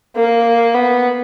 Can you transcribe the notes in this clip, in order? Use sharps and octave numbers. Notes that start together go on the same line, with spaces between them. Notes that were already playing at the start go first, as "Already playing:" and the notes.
A#3
B3